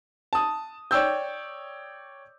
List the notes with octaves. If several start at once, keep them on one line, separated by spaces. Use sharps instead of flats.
A5 D#6
C#5 D5 G5 E6 G6